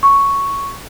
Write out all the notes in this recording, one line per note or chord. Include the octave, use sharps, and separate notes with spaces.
C#6